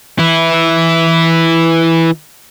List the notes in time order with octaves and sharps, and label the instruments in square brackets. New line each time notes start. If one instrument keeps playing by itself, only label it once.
[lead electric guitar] E3 E4